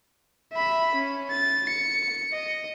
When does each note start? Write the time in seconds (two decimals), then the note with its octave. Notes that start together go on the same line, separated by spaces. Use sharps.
0.53 E5 B5
0.95 C#4
1.31 A6
1.69 C#7
2.33 D#5